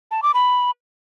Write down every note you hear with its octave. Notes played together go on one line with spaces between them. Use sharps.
A5
D6
B5